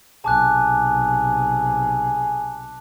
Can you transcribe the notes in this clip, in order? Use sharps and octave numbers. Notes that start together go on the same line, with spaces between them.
B1 C3 G#4 A5 D6 F#6